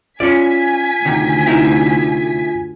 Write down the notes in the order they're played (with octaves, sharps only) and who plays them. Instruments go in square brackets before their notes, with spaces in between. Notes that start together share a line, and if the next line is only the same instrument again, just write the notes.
[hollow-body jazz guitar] C#4 D5 [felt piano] F4 [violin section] G#5 B6
[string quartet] D2 [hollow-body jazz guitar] C3 D#3
[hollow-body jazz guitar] C3 D#4 E4